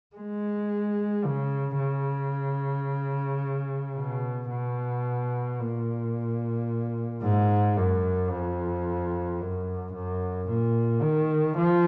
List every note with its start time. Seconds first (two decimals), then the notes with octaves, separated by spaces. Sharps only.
0.16 G#3
1.25 C#3
1.79 C#3
3.96 B2
4.50 B2
5.59 A#2
7.22 G#2
7.77 F#2
8.30 F2
9.40 F#2
9.93 F#2
10.49 A#2
11.02 D#3
11.57 F3